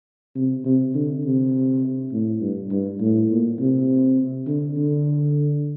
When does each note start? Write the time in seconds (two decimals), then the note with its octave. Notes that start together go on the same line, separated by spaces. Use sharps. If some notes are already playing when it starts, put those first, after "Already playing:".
0.35 C3
0.65 C3
0.94 D3
1.24 C3
2.12 A2
2.41 G2
2.71 G2
3.00 A2
3.30 A#2
3.59 C3
4.47 D3
4.77 D3